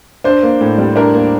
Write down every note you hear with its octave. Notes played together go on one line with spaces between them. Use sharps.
D4 C5
A#3
A2
G3
D4 A#4
A#3